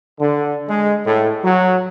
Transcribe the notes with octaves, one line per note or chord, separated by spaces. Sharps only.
D3
G#3
A2
F#3